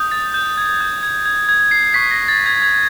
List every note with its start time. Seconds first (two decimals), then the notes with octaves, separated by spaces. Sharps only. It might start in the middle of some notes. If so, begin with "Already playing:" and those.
Already playing: D#6 G6
0.11 A6
0.34 G6
0.57 G#6
0.81 G6
1.03 G#6
1.26 G#6
1.49 G#6
1.71 C7
1.94 C#6 F#6 B6
2.11 A#6
2.28 A6
2.46 G#6
2.62 G#6